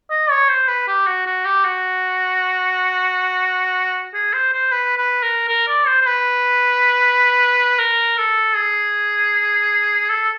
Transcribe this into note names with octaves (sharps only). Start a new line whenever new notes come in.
D#5
C#5
C5
B4
G4
F#4
F#4
G4
F#4
G#4
C5
C5
B4
B4
A#4
A#4
D5
C5
C5
B4
A#4
A4
G#4
A4